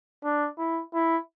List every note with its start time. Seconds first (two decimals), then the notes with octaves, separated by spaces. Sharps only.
0.24 D4
0.58 E4
0.94 E4